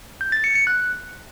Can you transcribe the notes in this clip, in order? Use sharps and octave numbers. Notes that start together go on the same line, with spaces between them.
G6
A6
C#7
C#7
F#6